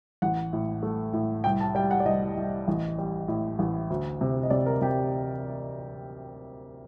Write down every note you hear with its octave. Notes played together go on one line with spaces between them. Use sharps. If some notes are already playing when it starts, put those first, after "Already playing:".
A1 F#5
A2
A3
A2
C2 G5
A5
G3 G5
F#5
D5
C2 D#5
C2
A1
G3
A2
A1
D2
C3
D#5
C3 D5
A#4
C3 G4